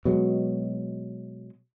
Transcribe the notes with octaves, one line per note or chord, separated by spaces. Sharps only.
B2 F#3 G#3